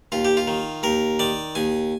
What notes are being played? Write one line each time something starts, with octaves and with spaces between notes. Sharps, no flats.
D#2 F4
G4
F4
D#3
D#2 A#4
D#3 D5
D#2 G#5